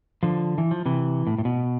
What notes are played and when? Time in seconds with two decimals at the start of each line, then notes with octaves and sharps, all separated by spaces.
0.23 D3 F3
0.58 E3
0.71 F3
0.86 C3 E3
1.27 A2
1.38 A2
1.45 B2